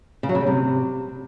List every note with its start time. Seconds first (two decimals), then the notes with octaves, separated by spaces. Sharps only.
0.23 C#3
0.29 F#3
0.35 C#3
0.41 G3
0.47 C3